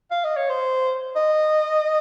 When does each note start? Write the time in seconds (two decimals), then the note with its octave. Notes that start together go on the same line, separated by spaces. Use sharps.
0.11 F5
0.24 D#5
0.37 C#5
0.50 C5
1.16 D#5